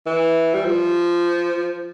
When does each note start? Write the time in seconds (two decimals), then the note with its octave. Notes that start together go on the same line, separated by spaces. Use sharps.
0.06 E3
0.54 G3
0.65 F3